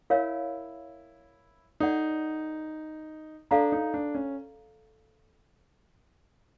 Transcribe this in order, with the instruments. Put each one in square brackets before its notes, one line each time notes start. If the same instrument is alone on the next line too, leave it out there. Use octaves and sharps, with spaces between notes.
[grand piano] E4 [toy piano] A#4 C#5 F5
[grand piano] D#4 [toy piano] A4 D5 F#5
[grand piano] D4 [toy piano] A4 D5 F5 A#5
[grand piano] D#4
D4
C#4